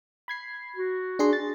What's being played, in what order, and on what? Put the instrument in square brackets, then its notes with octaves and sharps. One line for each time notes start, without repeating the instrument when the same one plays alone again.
[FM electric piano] B5 G#6 C7
[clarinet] F#4
[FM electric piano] D4 G#4 C6
A6